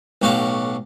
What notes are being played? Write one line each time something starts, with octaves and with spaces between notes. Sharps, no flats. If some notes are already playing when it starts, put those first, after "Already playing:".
B1 A2 F#4 G4 F5